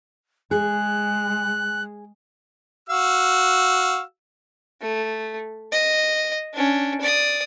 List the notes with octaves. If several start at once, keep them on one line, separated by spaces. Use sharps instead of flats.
G#3 G#4 F#6
F#4 F5 E6
A3
D#5
C#4 D4
D5 D#6